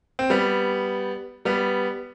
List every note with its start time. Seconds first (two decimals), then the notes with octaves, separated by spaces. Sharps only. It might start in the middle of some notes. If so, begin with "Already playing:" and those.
0.19 C4
0.30 G3 B3
1.45 G3 B3